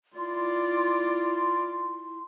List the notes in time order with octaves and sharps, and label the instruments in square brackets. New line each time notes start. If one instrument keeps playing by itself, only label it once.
[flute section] E4 C6 [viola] F4 D5